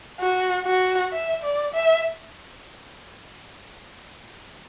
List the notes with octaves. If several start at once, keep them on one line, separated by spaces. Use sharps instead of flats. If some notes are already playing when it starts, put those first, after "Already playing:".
F#4
F#4
E5
D5
E5